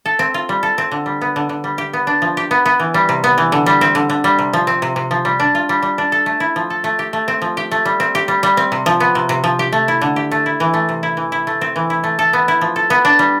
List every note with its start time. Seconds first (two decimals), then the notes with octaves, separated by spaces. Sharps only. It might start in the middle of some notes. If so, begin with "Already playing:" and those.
0.06 A4
0.19 C4
0.34 F4
0.49 G3
0.63 A4
0.78 C4
0.91 D3
1.06 G3
1.21 B3
1.36 D3
1.49 D3
1.64 G3
1.78 G4
1.93 B3
2.07 D4
2.22 F3
2.37 G4
2.51 B3
2.65 B3
2.80 E3
2.94 G3
3.09 C3
3.24 B3
3.38 E3
3.52 D3
3.66 G3
3.81 C4
3.95 D3
4.10 D3
4.24 G3
4.39 C3
4.53 F3
4.67 C4
4.82 C3
4.96 C3
5.11 F3
5.25 G3
5.40 D4
5.55 F4
5.69 G3
5.82 G3
5.98 D4
6.12 A4
6.26 A3
6.40 E4
6.56 F3
6.70 A4
6.84 A3
6.99 G4
7.13 A3
7.28 C4
7.42 F3
7.57 G4
7.71 A3
7.85 G3
8.00 C4
8.15 G4
8.28 G3
8.43 G3
8.57 C4
8.72 C3
8.86 F3
9.00 B3
9.15 C3
9.29 C3
9.44 F3
9.59 G4
9.73 A3
9.88 E4
10.02 D3
10.16 G4
10.31 A3
10.46 E4
10.60 E3
10.74 A3
10.89 C3
11.03 E4
11.17 E3
11.32 E4
11.47 A3
11.61 C4
11.76 E3
11.90 E4
12.04 A3
12.19 A4
12.33 B3
12.48 E4
12.61 F3
12.76 A4
12.90 B3
13.05 D4
13.19 G3